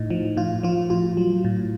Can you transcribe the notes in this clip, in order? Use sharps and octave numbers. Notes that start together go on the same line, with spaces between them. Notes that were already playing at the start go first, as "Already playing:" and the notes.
Already playing: A2 D#4
F3
A2 F4
F3 F4
A2 F4
F#3
A2